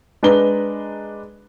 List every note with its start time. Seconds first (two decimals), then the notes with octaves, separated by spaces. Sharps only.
0.23 G#3 D4 B4 A#5 G7